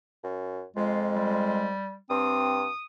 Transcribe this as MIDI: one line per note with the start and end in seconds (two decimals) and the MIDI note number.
0.24 0.63 42
0.76 1.73 41
0.76 1.68 56
0.76 1.08 65
1.15 1.97 55
2.10 2.66 43
2.10 2.67 60
2.10 2.83 87